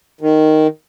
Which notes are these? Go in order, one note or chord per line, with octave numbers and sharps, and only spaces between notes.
D#3